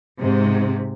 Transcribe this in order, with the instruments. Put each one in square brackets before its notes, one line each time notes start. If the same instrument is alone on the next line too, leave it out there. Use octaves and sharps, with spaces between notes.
[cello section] G#2 C3